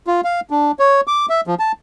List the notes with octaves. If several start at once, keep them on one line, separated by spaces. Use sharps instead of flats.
F4
F5
D4
C#5
D6
E5
F3
A5